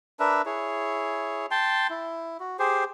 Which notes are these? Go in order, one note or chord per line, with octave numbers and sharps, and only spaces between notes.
D4 A#4 B4 E5
E4 G#4 C#5
G5 A5 C6
E4
F#4
G4 G#4 C5